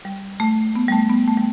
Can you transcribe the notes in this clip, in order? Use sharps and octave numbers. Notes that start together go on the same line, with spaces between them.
G3
A3
B3
G3
A3
B3
A3
G3